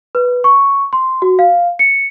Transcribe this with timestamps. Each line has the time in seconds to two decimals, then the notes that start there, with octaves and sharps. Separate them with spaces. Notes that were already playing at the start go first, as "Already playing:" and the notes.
0.15 B4
0.44 C#6
0.93 C6
1.22 F#4
1.39 F5
1.79 C#7